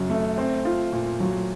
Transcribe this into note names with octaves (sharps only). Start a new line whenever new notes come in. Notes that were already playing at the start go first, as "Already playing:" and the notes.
Already playing: F#2 C#3 F#3
A3
C4
F4
A#2
F#3